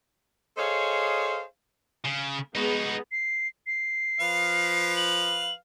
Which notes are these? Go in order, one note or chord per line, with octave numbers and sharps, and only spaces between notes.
G#4 A4 C5 C#5 D#5 F5
C#3
G#3 B3 D#4 F#4 G#4
C7
C7
F3 B4 F5
F#7